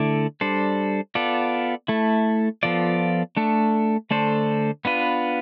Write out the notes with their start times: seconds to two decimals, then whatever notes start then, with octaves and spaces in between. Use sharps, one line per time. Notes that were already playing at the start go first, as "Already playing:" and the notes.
Already playing: D3 A3 E4 A4 D5
0.41 G3 D4 A4 C5
1.15 B3 F4 A4 D5
1.88 A3 E4 A4
2.63 F3 B3 F4 A4 D5
3.37 A3 D4 A4
4.11 D3 A3 D4 A4 C5
4.85 B3 D4 F4 B4